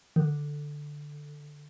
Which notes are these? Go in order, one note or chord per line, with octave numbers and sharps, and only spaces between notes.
D#3
D3